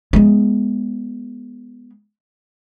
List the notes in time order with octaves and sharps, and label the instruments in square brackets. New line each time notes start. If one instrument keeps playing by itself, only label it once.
[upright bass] G#3 B3